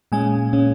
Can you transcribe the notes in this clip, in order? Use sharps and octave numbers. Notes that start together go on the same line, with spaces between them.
A#2 G#3 C#4 G#5
A#2 G#3 C#4